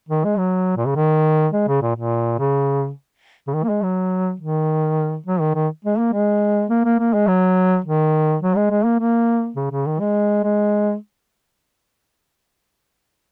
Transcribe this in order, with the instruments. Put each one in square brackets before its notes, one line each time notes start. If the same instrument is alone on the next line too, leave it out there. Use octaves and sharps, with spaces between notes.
[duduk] D#3
G#3
F#3
A#2
C#3
D#3
G#3
C#3
A#2
A#2
C#3
C#3
D#3
A#3
G#3
F#3
D#3
F#3
D#3
D#3
G#3
A#3
G#3
A#3
A#3
A#3
G#3
F#3
D#3
F#3
G#3
G#3
A#3
A#3
C#3
C#3
D#3
G#3
G#3